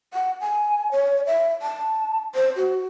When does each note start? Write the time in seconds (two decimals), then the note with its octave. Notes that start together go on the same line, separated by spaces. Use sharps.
0.14 F#5
0.41 G#5
0.92 C#5
1.27 E5
1.62 A5
2.35 C5
2.56 F#4